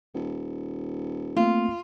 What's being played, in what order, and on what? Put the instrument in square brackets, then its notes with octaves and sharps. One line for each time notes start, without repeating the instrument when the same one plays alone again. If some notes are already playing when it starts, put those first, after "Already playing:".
[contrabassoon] D#1
[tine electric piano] A3 A#3 C4 [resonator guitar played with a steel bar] F4